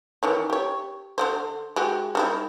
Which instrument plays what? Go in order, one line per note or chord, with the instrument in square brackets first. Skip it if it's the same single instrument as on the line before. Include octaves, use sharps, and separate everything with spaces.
[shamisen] D#3 E3 C#4
G4 C#5
D3 A3 C5
G#3 F#4 G4
G3 D#4 E4